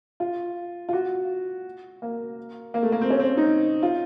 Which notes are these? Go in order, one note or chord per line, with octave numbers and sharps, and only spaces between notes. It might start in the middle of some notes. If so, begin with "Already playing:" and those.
F4
F4
F#4
A#3
A#3
A3
A#3
C4
C#4
C4
D#4
F4